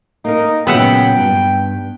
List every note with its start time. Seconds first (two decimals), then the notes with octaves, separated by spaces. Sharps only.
0.25 A#3 D#4 A#4
0.67 A#2 C#3 F#3 B3 E5 F#5 G5
1.17 G2